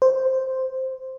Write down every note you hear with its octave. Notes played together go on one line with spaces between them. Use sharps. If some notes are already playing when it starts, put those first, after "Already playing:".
C5